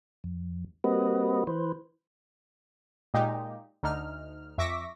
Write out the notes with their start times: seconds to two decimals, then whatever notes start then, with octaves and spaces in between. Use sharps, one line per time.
0.24 F2
0.84 G3 A#3 C4 F#4 B4 D#5
1.47 E3 B4 C5
3.14 A#2 G#3 D#4 G4
3.83 D2 D#4 F6
4.58 F2 E5 C#6 D6 A#6 B6